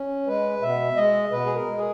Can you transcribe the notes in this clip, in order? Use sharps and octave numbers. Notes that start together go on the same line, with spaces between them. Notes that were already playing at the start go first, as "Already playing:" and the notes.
Already playing: C#4
G#3 B4
B2 E5
G#3 D#5
B2 B4
G#4
A#4
G#3
G#4